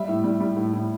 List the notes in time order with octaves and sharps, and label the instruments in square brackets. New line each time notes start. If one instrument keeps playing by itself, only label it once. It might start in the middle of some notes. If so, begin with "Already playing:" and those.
Already playing: [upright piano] G3 E5
A2
G3
G3
A2
A2